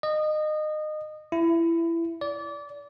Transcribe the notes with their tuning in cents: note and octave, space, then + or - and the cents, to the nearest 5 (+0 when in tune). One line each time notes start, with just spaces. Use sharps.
D#5 -25
E4 +20
D5 -25